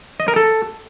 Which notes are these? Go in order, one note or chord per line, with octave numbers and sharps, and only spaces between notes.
D#5
A#4
A4